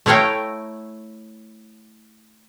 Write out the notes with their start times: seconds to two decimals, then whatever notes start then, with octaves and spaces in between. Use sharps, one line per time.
0.06 A3 E4 C#5 F5 G5 A#5